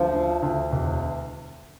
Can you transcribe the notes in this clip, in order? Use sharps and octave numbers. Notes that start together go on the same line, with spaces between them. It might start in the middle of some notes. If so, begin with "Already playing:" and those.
Already playing: D2 F3
D3
D2
E1